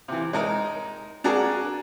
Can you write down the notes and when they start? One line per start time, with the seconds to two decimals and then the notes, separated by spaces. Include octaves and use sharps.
0.08 C3 E3
0.33 G#3 D#4 A#4
1.24 D4 F#4 G#4 A#4